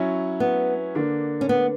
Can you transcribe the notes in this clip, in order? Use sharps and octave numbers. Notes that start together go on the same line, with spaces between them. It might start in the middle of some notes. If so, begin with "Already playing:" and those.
Already playing: F#3 C#4 E4
B3
D3 A#3 D4
C#4
B3